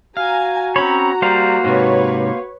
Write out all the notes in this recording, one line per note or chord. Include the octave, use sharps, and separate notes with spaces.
F#4 F5 G#5 A#5 G#6
C4 C#4 C#5 A#5 B5
G3 A#3 C5 F5
G#2 C3 B4 C#5